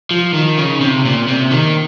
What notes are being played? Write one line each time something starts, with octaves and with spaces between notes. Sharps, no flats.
F3
D#3
C#3
C3
A#2
C3
D#3